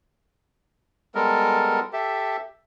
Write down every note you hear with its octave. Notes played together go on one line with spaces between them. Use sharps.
G3 G#3 B3 A4 A#4
G4 A4 E5